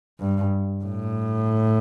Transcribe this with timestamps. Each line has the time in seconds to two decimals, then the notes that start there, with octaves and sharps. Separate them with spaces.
0.20 G2
0.84 A2